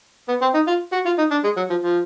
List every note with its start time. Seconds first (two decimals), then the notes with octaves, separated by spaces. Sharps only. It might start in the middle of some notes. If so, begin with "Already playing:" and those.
0.28 B3
0.41 C4
0.54 D#4
0.67 F4
0.92 F#4
1.06 F4
1.18 D#4
1.31 D4
1.44 G#3
1.57 F#3
1.70 F3
1.82 F3